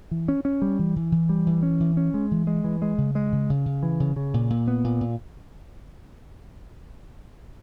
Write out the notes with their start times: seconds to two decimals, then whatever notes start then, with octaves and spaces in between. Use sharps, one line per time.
0.11 E3
0.28 C#4
0.45 C#4
0.62 G3
0.79 E3
0.96 E3
1.12 E3
1.29 G3
1.47 E3
1.63 C#4
1.80 E3
1.97 C#4
2.14 G#3
2.31 E3
2.47 G#3
2.64 E3
2.82 G#3
2.98 C#3
3.15 G#3
3.32 C#3
3.50 C#3
3.66 C#3
3.83 E3
4.00 C#3
4.16 C#3
4.34 A#2
4.50 A#2
4.68 B3
4.84 A#2
5.01 A#2